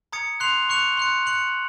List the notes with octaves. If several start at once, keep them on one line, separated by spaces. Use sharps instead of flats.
A#5 D#6 G#6 C#7
C6 F#6 C7 F7
C#6 F#6 C#7 F7
C6 F#6 C#7
F#6 C#7 F#7